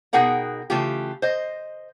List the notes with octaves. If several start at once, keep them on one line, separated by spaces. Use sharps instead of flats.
B2 D#4 G#4 A#4 F#5 G5
C#3 E3 A3 F4 G4
C5 D#5